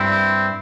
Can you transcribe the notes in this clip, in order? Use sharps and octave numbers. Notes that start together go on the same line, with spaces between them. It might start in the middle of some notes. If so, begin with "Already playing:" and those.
Already playing: G2 G3 C4 E4